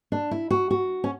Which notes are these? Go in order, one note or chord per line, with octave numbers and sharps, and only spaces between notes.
D4
E4
F#4
F#4
C#4